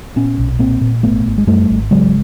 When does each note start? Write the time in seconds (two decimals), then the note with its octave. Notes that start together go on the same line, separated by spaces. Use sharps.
0.16 A#2 B3 C#4
0.38 B1
0.59 A#2 A#3 C4
0.81 A#2
1.03 G#1 A3 B3
1.26 G#1
1.38 G#3
1.47 F#2 G3 A3
1.70 G#1
1.91 C#3 F#3 G#3